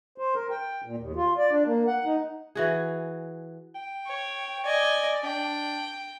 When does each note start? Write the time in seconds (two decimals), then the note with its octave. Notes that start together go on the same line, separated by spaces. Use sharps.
0.18 C5
0.35 A#4
0.51 G5
0.83 A#2
0.97 D#2
1.16 F4
1.38 D5
1.51 D4
1.65 A#3
1.87 F#5
2.05 D#4
2.55 E3 F#4 G#4
3.75 G5
4.07 C#5
4.65 D5 D#5 G#5
5.23 D4 G5